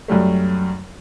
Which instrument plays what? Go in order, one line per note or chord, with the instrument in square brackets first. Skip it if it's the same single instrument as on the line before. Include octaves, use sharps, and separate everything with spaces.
[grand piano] F#2 F#3 G3 A3